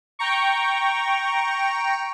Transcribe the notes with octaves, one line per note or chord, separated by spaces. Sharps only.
G5 A#5 C#6